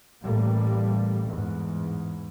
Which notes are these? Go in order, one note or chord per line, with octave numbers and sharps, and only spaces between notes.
A1 A2 G3 A3 A#3
E2 G#2